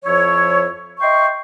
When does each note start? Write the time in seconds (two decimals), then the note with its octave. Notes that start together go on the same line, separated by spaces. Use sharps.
0.04 F2 F3 E4 C#5
1.01 D#5 E5 G5 C6 C#6